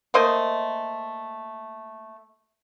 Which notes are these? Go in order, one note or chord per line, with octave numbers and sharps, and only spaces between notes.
A3 A#3 C5 D#5